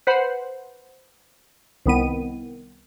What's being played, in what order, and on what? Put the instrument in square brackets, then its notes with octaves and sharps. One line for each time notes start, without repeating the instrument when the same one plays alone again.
[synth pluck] B4 C5 F#5 B5
C2 D#3 B3 D#7